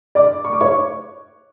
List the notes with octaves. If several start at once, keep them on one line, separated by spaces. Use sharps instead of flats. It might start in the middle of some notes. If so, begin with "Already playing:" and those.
D5 D6
C#6
D6
C#5 C#6